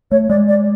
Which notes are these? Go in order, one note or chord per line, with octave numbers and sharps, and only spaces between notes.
A3 C#5
G#3 D5
D5